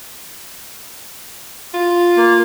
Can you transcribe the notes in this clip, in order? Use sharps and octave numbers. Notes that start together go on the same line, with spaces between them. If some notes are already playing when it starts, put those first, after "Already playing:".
F4
A#3